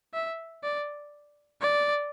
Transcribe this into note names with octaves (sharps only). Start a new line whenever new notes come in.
E5
D5
D5